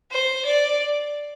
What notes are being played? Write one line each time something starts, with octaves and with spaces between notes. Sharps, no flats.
C5
D5